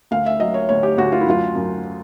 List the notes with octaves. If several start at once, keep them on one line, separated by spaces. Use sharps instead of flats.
D2 F5
E5
F#3 D#5
C#5
D2 C#5
G4
D2 F#4
F4
E4
F#2 F4
F#2